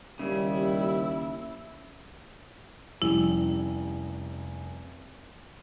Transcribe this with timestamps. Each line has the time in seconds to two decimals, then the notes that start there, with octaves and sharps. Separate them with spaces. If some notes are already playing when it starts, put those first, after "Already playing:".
0.19 D#2 C#3 G3 E4
3.02 F1 G3 C#4 E4